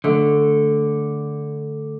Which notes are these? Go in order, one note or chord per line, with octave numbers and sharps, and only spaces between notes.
D3 A3